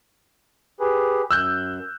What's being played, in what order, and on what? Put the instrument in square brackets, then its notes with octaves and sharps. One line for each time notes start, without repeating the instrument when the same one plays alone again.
[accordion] G4 G#4 B4
[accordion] F#2 [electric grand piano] E6 F#6 G6